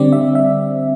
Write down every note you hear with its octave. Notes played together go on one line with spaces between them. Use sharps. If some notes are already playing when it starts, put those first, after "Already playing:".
Already playing: D3 G3 C4 D5
E5
E5